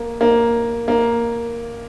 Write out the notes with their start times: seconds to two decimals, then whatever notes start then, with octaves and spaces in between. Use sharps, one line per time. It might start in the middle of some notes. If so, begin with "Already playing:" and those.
Already playing: A#3
0.21 A#3
0.88 A#3